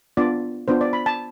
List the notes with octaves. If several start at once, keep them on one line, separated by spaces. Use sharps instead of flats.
B3 D4 F4 D5
B3 D4 F4 C5
D5
B5
A5